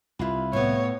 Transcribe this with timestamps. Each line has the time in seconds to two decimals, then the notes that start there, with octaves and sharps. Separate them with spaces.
0.19 C2 E4 F4 B4
0.53 A2 B3 C#5